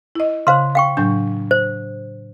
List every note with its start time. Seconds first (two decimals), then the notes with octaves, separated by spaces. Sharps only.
0.15 E4 D#5
0.47 C#3 C5 F5 C6
0.75 F5 G5 C#6
0.97 A2 F#3 D4 G6
1.51 C5